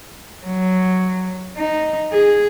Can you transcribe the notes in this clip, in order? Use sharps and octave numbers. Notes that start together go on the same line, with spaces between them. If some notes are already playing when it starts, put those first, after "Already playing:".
F#3
D#4
G#4